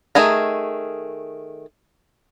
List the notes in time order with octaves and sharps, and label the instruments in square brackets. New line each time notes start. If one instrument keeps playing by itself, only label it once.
[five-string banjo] D#3 A3 G#4 A#5